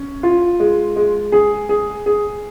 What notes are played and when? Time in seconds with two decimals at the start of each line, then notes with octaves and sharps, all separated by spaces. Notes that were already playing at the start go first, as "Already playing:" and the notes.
Already playing: C#4
0.23 F4
0.60 G#3
0.96 G#3
1.32 G#4
1.69 G#4
2.06 G#4